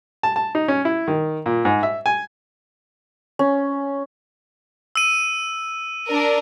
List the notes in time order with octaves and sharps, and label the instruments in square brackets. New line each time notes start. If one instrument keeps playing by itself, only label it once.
[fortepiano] A5
A5
D#4
C#4
E4
D#3
A#2
G#2
E5
G#5
[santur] C#4
[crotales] E6 D#7
[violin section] D4 A#4